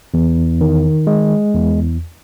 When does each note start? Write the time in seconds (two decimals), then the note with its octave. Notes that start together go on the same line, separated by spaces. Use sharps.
0.14 E2
0.61 D#3
1.07 G#3
1.55 E2